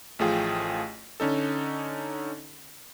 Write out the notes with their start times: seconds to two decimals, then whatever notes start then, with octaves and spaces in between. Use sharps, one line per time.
0.19 A1 F3 A3 F4 G#4 G5
1.20 D3 C#4 D#4 A4